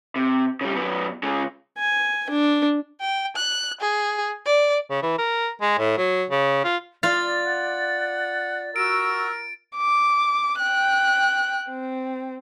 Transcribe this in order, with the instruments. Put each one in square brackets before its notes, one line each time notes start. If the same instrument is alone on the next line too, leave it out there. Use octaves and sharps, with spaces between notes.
[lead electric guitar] C3
C#3 G3
F#2 B3
C#3 G#3
[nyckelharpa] G#5
D4
[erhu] G5
F#6
G#4
D5
[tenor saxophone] C#3
E3
A#4
G#3
A2
F#3
C#3
F4
[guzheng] F4 F5 [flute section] D5 [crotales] A6
[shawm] F#5
[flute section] F#4 E6 [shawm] A#4 [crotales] D7
[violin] D6
G5 F#6
C4